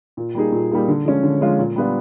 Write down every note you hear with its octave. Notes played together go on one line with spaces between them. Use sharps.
A#2
G3 A#3 D#4 G#4
A#2
G3 A#3 D#4 G#4
D3
F3 G#3 C#4 F4
D3
F3 G#3 C#4 F4
A#2
G3 B3 D4 F4